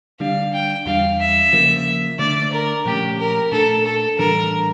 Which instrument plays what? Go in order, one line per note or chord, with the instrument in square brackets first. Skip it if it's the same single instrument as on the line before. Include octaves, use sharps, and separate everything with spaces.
[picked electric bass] D3 G3 D4 [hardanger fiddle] F5
[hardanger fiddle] G5
[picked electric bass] E2 E3 G3 D4 [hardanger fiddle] F5
[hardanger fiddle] E5
[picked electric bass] C#3 F3 A#3
[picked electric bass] D3 A3 D4 [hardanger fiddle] D5
[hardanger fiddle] A#4
[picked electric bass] A#2 F3 A3 C#4 [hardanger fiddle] G4
[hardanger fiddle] A#4
[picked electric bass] A#2 A3 D4 [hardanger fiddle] A4
[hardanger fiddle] A4
[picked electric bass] A2 E3 G3 D4 [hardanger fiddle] A#4